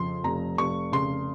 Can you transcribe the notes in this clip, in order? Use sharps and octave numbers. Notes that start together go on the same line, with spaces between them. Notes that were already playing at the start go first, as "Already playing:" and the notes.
Already playing: F2 C#3 C6
F1 A#5
F1 C#6
C#3 C6